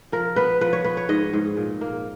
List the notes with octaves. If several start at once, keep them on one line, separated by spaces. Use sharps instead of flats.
F3 A#4
B3 B4
F3 B4
C#5
B3 B4
C#5
G#2 D#5
G#2
A#2
A#3